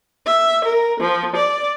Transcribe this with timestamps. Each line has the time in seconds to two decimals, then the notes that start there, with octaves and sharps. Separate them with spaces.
0.25 E5
0.65 A#4
1.00 F3
1.35 D5